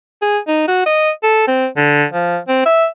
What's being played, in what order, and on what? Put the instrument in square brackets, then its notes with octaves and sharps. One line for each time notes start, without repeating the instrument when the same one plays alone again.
[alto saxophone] G#4
D#4
F#4
D#5
A4
C4
D3
F3
C4
E5